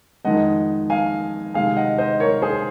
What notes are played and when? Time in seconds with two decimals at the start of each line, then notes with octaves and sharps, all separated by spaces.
0.25 F2 D#3 G#3 D#5 F#5
0.90 F5 G#5
1.54 C3 D#3 G#3 F5 G#5
1.76 D#5 F#5
1.98 C5 D#5
2.20 A#4 C#5
2.42 G#4 C5